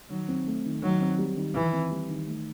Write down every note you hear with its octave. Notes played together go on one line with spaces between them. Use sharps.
D#3 F#3
C4
A3
D#3
D#3 F#3
C4
G3
D#3
D#3 E3
C4
G3
D#3
A3